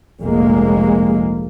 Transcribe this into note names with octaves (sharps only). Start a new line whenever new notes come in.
F1 A#1 G#3 A#3